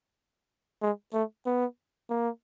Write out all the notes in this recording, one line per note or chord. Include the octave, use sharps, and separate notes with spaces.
G#3
A3
B3
A#3